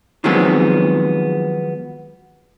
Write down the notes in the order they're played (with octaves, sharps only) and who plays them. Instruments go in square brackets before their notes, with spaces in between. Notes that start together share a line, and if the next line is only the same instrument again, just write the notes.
[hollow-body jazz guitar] D#3 F3 F#3 G#3 B3 C4